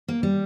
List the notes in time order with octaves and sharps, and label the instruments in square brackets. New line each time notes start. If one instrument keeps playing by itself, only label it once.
[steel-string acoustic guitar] A#3
G3